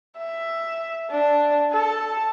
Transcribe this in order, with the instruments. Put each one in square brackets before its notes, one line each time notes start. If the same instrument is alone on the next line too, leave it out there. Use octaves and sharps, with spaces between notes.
[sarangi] E5
D4
A4